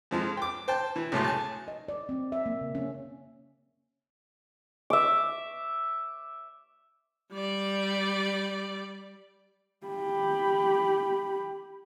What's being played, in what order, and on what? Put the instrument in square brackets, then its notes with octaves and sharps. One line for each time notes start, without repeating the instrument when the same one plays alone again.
[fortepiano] F2 F3 G#3
G5 D6
C5 G5 A5
E3
C#2 A2 F#3 A3 A5 C6
G#5 A5
[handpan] D#5
D5
C4
E5
A#3
C#3
C#4
[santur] E5 D6
[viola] G3 D5
[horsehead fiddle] G4 B5